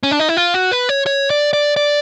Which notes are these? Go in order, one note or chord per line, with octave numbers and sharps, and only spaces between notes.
C#4
D4
D#4
E4
F4
F#4
B4
C#5
C#5
D5
D5
D5